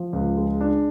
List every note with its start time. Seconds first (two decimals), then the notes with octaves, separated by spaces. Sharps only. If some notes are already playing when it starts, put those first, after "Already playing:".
Already playing: F3
0.13 C#2
0.37 G#3
0.61 D4